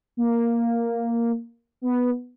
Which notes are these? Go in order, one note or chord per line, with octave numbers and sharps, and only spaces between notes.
A#3
B3